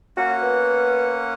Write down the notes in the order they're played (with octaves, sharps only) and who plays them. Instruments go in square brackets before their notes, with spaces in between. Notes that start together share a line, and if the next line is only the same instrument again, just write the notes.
[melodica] A#3 C#4 F#5 [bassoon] F#4
[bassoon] B3